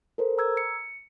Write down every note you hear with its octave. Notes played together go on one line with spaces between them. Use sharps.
A4 A#4 C5
A#5 E6 G#6
C#7